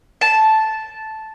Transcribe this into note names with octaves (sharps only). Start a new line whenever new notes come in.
A5